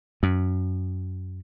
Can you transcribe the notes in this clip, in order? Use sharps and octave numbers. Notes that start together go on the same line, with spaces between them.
F#2